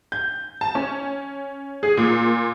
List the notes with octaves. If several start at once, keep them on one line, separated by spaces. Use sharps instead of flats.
G6
A5
C#4
G#4
A#2